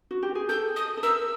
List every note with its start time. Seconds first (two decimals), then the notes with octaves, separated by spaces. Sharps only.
0.11 F#4
0.23 G4
0.35 G#4
0.49 A4 G6
0.76 D#6
0.97 A4
1.03 A#4 E6